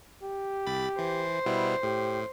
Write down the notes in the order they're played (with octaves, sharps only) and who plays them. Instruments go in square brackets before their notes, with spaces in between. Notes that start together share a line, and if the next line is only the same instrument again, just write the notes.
[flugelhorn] G4
[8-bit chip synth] C2 B5 A6
[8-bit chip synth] E3 [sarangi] C5
[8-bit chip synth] B2 G3 B3 [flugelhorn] E4
[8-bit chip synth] A2 [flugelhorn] G4